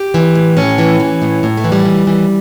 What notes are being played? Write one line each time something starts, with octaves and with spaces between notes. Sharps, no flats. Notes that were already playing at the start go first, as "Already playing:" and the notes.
Already playing: G4
E3
A2
A2 C#4
E3
E3
A2
A2
A3
E3
G3
E3
E3